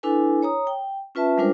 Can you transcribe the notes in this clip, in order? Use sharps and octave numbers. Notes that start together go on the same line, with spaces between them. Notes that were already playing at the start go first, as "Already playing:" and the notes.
D4 E4 A4 B4 G#5
C#5 A#5 D#6
G5
C#4 F4 B4 E5 A5
G3 G#3 D4 F4 A#4 C5